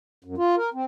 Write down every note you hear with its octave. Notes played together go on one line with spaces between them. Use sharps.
F#2
F4
A#4
C4